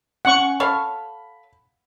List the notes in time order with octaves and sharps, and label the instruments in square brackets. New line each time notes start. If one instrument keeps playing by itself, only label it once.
[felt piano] C#4 G#5 [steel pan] F#5 C#6
[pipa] A4 C#5 F5 [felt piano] B5